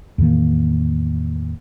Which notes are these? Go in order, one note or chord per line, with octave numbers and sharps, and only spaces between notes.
E2 A2 D#3 A#3